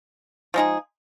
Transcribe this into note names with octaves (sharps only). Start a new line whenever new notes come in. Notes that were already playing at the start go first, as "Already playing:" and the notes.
F3 G#3 D#4 G#4